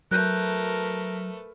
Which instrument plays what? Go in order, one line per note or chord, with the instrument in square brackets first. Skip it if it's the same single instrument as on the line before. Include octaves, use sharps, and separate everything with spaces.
[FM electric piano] F#3 [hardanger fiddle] A3 B4 [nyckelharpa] A#4 [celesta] F#6 G6